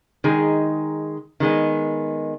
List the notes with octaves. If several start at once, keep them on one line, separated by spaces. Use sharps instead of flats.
D#3 G#3 D#4 G#4
D#3 G#3 B3